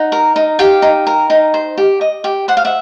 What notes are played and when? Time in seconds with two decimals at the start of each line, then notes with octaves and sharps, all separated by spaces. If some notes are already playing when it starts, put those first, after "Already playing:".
Already playing: D#4 F#5
0.12 A#4
0.36 D#4
0.59 G4 F5 G5
0.82 D#4
1.07 A#4
1.30 D#4
1.54 C5
1.77 G4
2.01 D#5
2.24 G4
2.48 C5 F#5
2.57 F5
2.65 E5 F#5